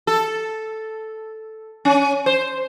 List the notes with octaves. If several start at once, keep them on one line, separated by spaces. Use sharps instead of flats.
A4
C#4
C5